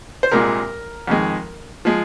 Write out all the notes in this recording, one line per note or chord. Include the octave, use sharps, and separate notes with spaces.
C5
C2 A#2 G#3 A#4
F2 D#3 G#3
F3 G#3